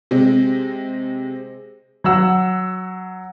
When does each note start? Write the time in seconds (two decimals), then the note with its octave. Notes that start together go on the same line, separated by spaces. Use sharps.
0.11 C3 G#3 C4
2.04 F#3 F#5 E6